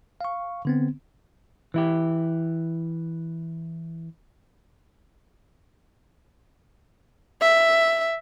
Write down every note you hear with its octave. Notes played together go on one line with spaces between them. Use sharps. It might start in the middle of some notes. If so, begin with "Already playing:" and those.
F5 C#6
D3 B3 C4
E3 E4 G4
E5